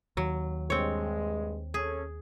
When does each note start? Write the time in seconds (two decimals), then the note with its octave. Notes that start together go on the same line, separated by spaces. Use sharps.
0.17 D#2 F#3
0.70 G2 G#3 C4 C#5
1.74 C#4 G#4 A4